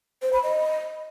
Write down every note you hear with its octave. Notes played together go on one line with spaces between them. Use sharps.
C5
B5
D#5